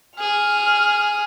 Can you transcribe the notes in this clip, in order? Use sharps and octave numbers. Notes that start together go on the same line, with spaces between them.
G#4 F6